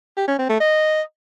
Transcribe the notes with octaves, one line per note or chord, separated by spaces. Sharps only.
G4
C#4
C4
A3
D#5